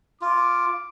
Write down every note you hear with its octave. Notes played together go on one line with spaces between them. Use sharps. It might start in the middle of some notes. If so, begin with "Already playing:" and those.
F4 D6